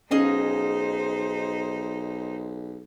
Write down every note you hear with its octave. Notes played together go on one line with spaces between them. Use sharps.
B1 C#4 D#4 G#4 C5 D#5 F5